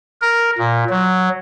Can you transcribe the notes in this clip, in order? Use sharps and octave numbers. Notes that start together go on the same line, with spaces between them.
A#4
A#2
F#3